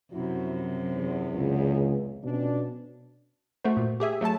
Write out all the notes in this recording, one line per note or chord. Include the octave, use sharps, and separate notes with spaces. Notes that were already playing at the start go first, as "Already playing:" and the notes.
F#2 C3 F3 E4 F#4
E2
C#2
F2 B2 C#4 D4
A3 F#4 C5
A#2
G4 G#4 E5 G#5
F#3 A3 A4 A5